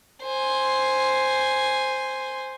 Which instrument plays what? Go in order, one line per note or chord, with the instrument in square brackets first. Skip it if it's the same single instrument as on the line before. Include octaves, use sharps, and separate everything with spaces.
[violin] C5 G#5